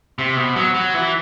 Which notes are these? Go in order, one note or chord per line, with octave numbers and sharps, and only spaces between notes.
C3
B2
F#3
F#3
E3